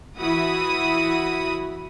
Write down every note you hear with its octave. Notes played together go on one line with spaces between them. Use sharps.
E3 E4 F#4 B5 D#6